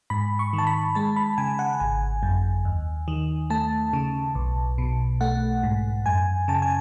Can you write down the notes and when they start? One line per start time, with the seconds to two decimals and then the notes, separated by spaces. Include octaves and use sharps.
0.10 G#2 B5
0.39 C#6
0.53 D#3
0.58 A5
0.67 B5
0.95 G#3 A5
1.16 B5
1.38 C#3 G#5
1.59 F#5
1.80 G#1 G#5
2.23 F#2
2.65 D#2
3.08 D#3
3.50 A3 A5
3.93 C#3
4.35 B1
4.78 B2
5.21 A3 F#5
5.63 G#2
6.06 F#2 G#5
6.48 C#3 A5
6.62 G#5